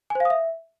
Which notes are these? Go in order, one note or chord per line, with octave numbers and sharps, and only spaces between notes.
G#5
C5
F5
D#6
E5